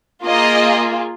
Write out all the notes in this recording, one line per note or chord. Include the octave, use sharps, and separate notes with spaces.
A#3 F4 G#4 D#5